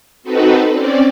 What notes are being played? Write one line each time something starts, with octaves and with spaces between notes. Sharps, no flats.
C4 D#4 F#4 A4 B4
C4 C#4 D5